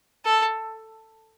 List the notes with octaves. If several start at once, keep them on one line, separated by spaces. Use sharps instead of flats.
A4